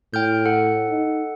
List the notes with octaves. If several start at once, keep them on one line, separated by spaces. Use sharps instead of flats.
A2 G5 F6 G6
A4 F#5
D#4